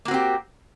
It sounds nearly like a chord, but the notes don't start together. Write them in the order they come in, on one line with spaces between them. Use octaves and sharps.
A#3 F#4 C4 G4